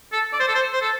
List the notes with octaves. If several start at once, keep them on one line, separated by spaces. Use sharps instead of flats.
A4
D5
C5
A4
C5
C5
A4